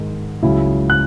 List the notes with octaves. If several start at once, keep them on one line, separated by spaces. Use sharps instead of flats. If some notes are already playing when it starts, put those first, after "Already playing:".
Already playing: G#2 D#3 G#3
C#2 C#3 F#3 C#4 E4
F#6